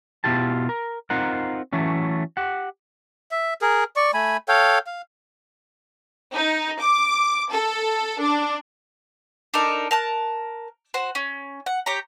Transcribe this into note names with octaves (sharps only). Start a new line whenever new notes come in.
B2 E3 E4 F4 G4 A5
A#4
C4 D#4 F4 A#4 F#5
E3 F#3 A3 C#4
G4 F#5
E5
G#4 A#4
D5 C#6
A3 G#5 B5
A4 C#5 F5 G5
F5
D#4
D6
A4
D4
D4 D#4 A4 A#4
A#4 A5 F#6
F#4 C5
C#4
F#5
G4 C#5 A#5